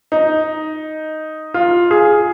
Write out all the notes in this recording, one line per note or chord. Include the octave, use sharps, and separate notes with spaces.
D#4
F4
G#4